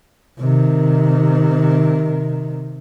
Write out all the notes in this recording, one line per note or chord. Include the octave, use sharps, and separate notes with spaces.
C3 D#3